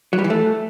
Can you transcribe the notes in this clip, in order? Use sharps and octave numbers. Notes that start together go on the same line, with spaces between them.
F#3
G3
E3
A3